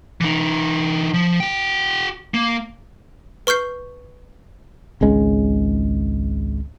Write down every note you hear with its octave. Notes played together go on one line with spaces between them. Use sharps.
E3 D#4
F3
F#4 G5
A#3
B4 C#6 F6 G6 C7
G#1 C#2 G#3 C#4